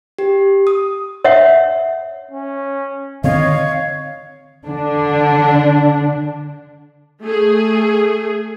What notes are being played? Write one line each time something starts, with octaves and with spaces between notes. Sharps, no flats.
G4
D#6
C#5 E5 F#5
C#4
D3 D#3 C4 C#5 D#5 F5
D3 D4
A3 G#4